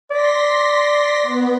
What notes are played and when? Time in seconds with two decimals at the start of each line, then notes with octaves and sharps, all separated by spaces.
0.11 D5 C6 A#6 B6
1.22 B3